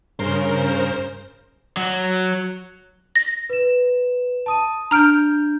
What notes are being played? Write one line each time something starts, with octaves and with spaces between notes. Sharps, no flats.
G2 C#3 C#4 A#4 C5
F#3
A#6
B4 E7
A5 D#6 D#7
D4 A#5 F6 G6 D7